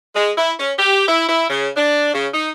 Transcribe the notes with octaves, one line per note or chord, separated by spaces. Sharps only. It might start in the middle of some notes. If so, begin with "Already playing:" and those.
G#3
E4
C#4
G4
E4
E4
C#3
D4
C#3
D#4